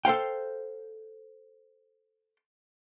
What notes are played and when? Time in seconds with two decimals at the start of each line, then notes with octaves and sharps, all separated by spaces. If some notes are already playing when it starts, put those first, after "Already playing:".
0.05 A4 C5 F5 G5